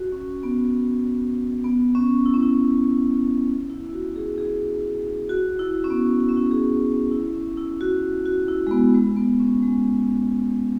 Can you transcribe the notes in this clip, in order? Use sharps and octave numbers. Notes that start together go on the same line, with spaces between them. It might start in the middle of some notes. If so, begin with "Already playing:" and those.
Already playing: F#4
C#4
B3
B3
C#4
E4
C#4
E4
E4
E4
F#4
G#4
G#4
F#4
E4
C#4
B3
E4
C#4
E4
G#4
F#4
E4
C#4
E4
F#4
F#4
E4
G#3
B3
G#3
B3
C#4
G#3